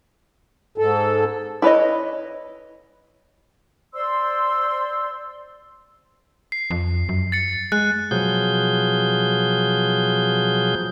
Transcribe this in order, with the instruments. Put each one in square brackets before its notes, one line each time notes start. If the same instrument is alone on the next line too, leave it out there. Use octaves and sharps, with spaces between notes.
[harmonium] G#2 A4
[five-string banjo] E4 B4 C#5 D#5
[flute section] C5 D5 C6 E6
[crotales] C7
[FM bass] F2
F#2
[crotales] A6 C#7
[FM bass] G#3 [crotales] F#6
[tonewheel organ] B2 F3 F#3 G#4 G6